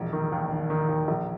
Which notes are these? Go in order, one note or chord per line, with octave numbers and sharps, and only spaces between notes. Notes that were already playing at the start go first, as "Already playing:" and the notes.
Already playing: E1 A#1
D#3
D#2
D#3
D#3
D#2
A#1